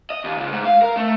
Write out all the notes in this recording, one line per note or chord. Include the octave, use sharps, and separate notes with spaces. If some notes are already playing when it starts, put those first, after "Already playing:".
D#5
D#2
C#2
G#2
F5
A#4
A3